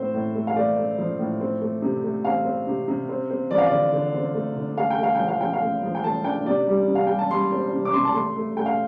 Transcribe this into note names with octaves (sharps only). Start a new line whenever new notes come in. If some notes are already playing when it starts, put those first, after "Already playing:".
Already playing: A2 C4 C5
A2
A3
F5
A3 D5
A3
F3
A2
C4
A3
C3
A3
C4 F5
C4
C3
C3
C4
C4
F3 D5
F5
D5
D3
D3
C4
A3
D3
A3 F5
G5
A3 F5
F3 G5
F5
F3 G5
F5
A3
F3
G5
A3 A5
D4 G5
C3 D5
G3
C3
F5
G3 G5
A5
G3 C6
C4
C3
D6
C3 C6
A5
A3 C6
A3
A3 G5
F5